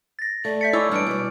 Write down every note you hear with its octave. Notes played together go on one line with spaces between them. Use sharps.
A6 A#6
A3 D5
E5 G6 A6 B6 C#7
D#4 E4 C#5 G#5 C#6 D6 E6
G#2 E3 G3 D4 F6 C#7 D7
B2 D5